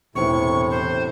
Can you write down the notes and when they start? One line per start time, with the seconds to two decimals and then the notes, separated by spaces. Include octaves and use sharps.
0.15 E1 A2 C3 E3 C#6
0.70 C5